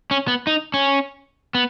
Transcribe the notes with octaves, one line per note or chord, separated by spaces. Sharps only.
C#4
B3
D#4
C#4
B3